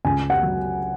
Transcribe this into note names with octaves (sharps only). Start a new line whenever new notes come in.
C#2 G#5
F#5
F#3